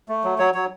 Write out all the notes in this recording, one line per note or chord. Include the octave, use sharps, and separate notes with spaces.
A3
F#3
F#3 C#5
F#3 C#5